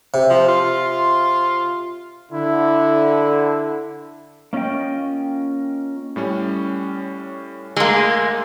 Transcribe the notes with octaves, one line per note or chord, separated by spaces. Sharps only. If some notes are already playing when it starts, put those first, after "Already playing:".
C3
F3
F4
D3 E4
A#3 C#4 F4 D#5 G5
A2 G3 C#4
D2 G#3 A#3 C6 E6